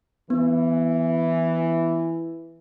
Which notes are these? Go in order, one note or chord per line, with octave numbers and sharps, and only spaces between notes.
E3 B3